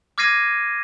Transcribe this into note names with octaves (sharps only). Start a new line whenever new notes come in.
D6 F6 G#6 A#6 C7 D#7